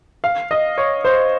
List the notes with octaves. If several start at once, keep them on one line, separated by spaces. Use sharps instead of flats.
F5
D#5
C#5
C5